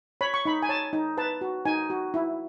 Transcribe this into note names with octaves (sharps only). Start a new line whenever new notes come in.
C#5 B5
C#6
D#4 B5
G#5
C#5 A5
D#4
B4 A5
F#4
D#4 G#5
F#4
E4